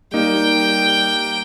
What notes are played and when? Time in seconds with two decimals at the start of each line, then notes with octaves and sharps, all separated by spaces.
0.14 G3 A#3 D#4 G5